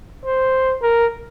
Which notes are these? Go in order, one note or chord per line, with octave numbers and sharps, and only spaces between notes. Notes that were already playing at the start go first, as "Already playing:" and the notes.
C5
A#4